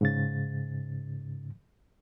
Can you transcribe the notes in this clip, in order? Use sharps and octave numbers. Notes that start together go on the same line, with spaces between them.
G#2 C#3 A6